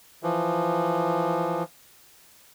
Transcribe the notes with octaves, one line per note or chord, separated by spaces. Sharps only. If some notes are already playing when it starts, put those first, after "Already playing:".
E3 F3